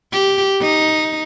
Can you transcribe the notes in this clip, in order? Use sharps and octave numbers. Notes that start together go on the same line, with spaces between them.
G4
D#4